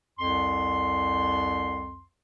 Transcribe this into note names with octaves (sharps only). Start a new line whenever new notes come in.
C2 F2 C6